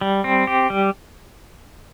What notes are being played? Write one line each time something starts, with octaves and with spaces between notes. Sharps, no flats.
G3
C4
G4
G3